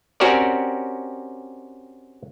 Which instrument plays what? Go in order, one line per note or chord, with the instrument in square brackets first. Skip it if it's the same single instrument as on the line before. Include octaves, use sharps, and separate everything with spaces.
[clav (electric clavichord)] C4 C#4 F#4 G4 A#4 D5